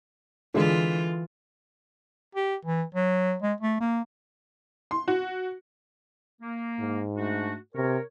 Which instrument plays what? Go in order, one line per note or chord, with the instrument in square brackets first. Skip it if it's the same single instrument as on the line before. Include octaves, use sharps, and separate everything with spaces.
[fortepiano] D3 G#3 [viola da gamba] E3 F4
[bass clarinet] G4
E3
F#3
G#3
A3
A#3
[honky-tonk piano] C6
F#4
[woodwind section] A#3
[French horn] G#2
[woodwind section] A3 D4 F#4
[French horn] C3 [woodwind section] A#4 C#5